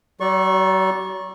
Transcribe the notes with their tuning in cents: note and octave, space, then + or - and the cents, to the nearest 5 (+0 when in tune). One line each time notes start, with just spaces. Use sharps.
F#3 +40 D5 -15 C#6 -25